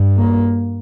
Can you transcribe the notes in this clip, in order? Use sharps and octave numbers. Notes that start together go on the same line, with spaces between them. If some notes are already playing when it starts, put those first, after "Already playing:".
Already playing: G2
A#3